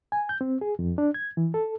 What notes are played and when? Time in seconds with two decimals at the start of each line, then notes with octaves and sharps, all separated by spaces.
0.12 G#5
0.29 G6
0.41 C4
0.61 G#4
0.79 F2
0.98 D4
1.14 G#6
1.37 E3
1.54 A4